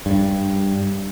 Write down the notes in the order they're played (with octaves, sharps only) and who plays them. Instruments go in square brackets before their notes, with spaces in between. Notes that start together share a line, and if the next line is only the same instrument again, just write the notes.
[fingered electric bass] G2